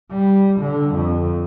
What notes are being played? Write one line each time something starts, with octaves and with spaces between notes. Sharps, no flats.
G3
D3
F2